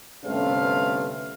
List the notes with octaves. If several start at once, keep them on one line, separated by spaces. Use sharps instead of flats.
G1 C3 A3 C#4 B4 F5